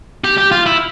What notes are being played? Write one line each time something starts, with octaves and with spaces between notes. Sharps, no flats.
G4
G4
F4
E4